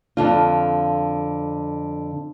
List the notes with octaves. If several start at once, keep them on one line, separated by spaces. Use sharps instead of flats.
F2 D3 F4